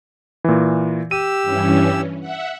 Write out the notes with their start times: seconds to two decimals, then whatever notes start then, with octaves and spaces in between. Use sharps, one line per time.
0.44 A#2 E3
1.11 G4 E6 D#7
1.43 G2 E3 C#4
2.20 E5 F#5